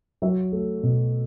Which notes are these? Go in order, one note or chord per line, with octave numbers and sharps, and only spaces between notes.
F#3 E5
A3
B2